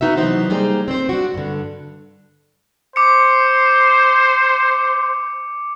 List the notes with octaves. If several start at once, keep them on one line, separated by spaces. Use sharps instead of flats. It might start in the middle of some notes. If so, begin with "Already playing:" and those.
B3 D#4 F#4 E5
C3 E3 F#3 B3 D#4 C5
G3 A#3 D#4 G#4 C5
C4 C5
D4 F#4
G2 D3
C5 D6 C#7